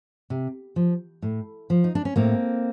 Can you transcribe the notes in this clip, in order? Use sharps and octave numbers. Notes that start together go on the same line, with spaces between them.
C3
F3
A2
F3
D#4
D4
C#4
A2 A#3 C4